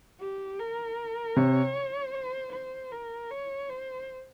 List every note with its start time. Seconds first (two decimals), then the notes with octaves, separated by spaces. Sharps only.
0.20 G4
0.59 A#4
1.36 C3 C#5
2.14 C5
2.53 C5
2.92 A#4
3.31 C#5
3.69 C5